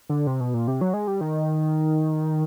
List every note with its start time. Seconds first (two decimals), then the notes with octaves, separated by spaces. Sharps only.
0.09 D3
0.27 C3
0.41 B2
0.54 A#2
0.68 C3
0.81 F#3
0.94 G#3
1.07 G3
1.21 D#3